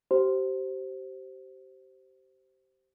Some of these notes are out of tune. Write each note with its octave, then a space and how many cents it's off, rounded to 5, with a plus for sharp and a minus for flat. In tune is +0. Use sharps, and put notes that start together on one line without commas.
G4 -30 C5 +0